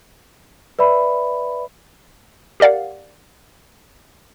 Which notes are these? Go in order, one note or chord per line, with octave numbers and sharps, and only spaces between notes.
B4 D5 E5 B5
G4 A#4 D5 F5 F#5